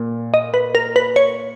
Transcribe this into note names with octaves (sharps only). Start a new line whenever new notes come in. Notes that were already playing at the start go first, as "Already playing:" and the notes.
Already playing: A#2
D#5
B4
A#4
B4
C#5